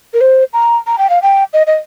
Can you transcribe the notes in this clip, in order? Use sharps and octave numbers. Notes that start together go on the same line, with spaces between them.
A#4
C5
A#5
A#5
G5
F5
G5
D#5
D#5